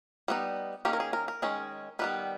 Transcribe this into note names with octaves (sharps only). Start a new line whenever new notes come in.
G3 B3 D#4
D#3 A#3 C#4 G4
A#4
G#4
A#4
A#4
D#3 G#3 C#4
D#3 G3 B3 B4